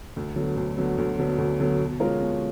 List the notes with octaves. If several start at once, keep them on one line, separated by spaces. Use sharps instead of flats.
D2
D3 F#3 B3
D2
D3 F#3 B3
D2
D3 F#3 B3
D2
D3 F#3 B3
B2
G#3 C#4 F4 A#4
B2